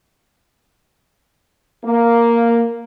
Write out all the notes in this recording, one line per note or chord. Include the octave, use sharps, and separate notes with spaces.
A#3